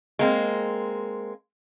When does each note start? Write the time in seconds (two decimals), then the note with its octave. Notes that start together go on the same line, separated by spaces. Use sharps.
0.19 G#3 A#3 C4